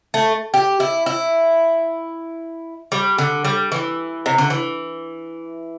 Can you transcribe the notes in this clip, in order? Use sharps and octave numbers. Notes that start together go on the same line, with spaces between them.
A3
G4
E4
E4
G3
D3
G3
E3
C3
D3
E3